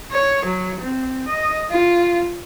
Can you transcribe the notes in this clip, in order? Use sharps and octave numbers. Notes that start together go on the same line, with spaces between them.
C#5
F#3
C4
D#5
F4